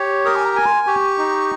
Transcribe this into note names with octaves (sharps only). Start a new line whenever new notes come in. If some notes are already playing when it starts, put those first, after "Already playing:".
Already playing: G4 C#5
A#4 D#6
G#5
A#5
G#5
A#5
C6
G4 C#6
D#4